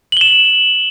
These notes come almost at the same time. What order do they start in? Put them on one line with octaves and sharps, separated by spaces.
F#7 G7 E7